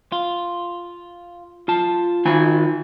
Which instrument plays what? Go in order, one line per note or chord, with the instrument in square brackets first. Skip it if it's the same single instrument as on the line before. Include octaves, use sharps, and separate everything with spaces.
[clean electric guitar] F4
F4 A5
[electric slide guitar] D#3 D#4 G#5